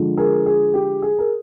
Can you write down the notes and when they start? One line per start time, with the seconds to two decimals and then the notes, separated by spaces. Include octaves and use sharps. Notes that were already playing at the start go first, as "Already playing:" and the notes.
Already playing: D3 F3 G#3
0.17 G#4 A#4
0.46 G#4
0.74 G4
1.02 G#4
1.19 A#4